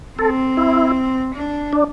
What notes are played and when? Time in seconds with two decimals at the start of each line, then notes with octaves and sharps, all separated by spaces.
0.19 C4 A4
0.57 E4
1.34 D4
1.73 D4